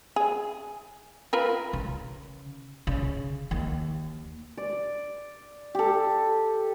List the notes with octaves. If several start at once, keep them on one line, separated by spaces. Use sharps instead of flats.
G#4
F4 A#4 B4
C#3
C#3
D#2
D5
G4 A4